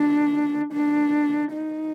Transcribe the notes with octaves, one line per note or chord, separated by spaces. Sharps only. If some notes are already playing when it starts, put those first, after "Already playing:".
Already playing: D4
D4
D#4